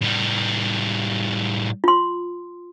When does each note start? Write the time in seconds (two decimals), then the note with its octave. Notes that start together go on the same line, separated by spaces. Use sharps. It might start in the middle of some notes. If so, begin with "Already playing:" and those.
0.01 A2 G3
1.84 F4 C6